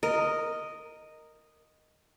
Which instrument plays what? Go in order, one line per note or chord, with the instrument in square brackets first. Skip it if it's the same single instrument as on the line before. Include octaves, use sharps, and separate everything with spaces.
[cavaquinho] A#4 [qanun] D#5